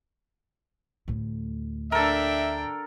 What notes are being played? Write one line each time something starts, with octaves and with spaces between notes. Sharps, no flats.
D2 A2
D4 A4 A#4 E5 G5